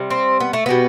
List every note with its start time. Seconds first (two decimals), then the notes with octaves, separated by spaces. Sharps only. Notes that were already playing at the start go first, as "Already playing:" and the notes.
Already playing: C3 G3
0.11 C4
0.40 B3
0.53 A3
0.66 B2 G3 B3